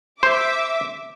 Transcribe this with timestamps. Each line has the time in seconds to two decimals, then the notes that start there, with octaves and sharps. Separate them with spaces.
0.23 C5 E5 D6